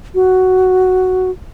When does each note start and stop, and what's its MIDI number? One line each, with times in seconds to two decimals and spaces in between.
0.15 1.30 66